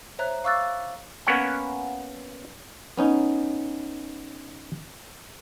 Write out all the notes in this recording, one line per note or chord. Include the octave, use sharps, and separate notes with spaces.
C5 C#5 E5 A#5 F#6
F5 C#6 D6 E6 F#6 A6
A#3 B3 C#4 C#5 F#5 G5
B3 C#4 D#4